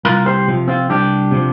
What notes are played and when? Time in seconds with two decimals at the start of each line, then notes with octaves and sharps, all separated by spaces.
0.05 C2 F4 A#4
0.26 G4 C5
0.48 C3 F3
0.68 C4 F4
0.90 C2 D4 G4
1.32 C3 F3